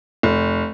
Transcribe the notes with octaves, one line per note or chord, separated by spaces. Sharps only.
F1